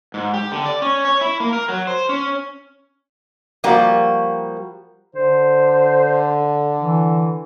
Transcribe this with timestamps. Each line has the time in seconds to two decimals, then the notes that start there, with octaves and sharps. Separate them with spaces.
0.14 G#2
0.34 G4
0.52 D3
0.66 D5
0.82 C#4
1.05 C#5
1.21 E4
1.40 A#3
1.53 A#4
1.69 F#3
1.87 C5
2.09 C#4
3.64 F3 G3 A#3 F#4
5.15 D3 C5
6.80 E3